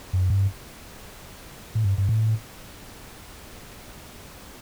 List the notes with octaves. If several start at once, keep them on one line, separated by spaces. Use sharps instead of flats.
F#2
G2
A2
G2
G2
A2